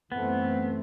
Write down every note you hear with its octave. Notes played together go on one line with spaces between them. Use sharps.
F#2 E3 A3 B3 C4